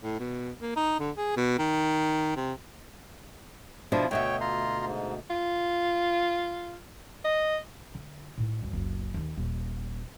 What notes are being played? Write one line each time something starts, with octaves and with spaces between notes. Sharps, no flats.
A2
B2
A#3
D#4
D3
G#4
B2
D#3
C3
B2 F3 D4 E4 F4
D2 B2 C#5 E5 G5
F4 A#5 C6
G#2
F4
D#5
D3
A2 D#4
D2 G2
F#1 C#2
D#2 D#3
D#1